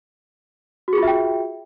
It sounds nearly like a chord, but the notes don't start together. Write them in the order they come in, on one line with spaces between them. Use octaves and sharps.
F#4 G#4 F4 E5 G5